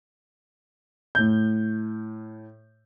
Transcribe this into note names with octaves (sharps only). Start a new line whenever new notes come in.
A2 G6